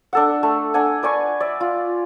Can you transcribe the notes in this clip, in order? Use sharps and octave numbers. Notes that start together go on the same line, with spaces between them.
D4 A4 F#5
A3
D4 F#5 G#5
B4 D5 G#5 C#6
D5 E5
F4